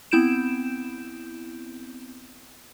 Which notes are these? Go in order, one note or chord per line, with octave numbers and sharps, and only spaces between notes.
B3 C4 E4 G6 D7 E7